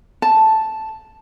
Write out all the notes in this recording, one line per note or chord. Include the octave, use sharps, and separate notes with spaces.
A5